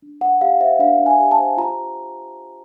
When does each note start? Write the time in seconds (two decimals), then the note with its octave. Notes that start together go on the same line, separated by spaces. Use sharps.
0.02 D4
0.21 D4 F#5
0.41 G4 F5
0.60 C5 E5
0.79 D4 F5
1.00 D4
1.06 G#5
1.19 G4
1.31 A5
1.39 C5
1.57 F4 A#5